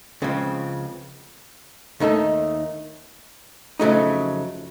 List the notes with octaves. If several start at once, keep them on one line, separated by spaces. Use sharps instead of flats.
C#2 C#3 F3 C4
D#2 D#3 A3 D#4 A4
F2 C#3 F#3 A3 D#4